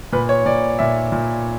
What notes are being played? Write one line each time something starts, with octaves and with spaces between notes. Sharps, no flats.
A#2 B4
C#5
A#2 D5
A#2 E5
A#2